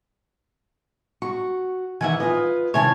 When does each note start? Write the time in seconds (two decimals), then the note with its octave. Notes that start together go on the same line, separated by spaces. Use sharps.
1.22 F#4 C#6
2.01 D#3 E3 E5 F#5 G#5
2.20 F4 B4 D#5
2.74 C3 D#3 E4 C#5 G#5 A5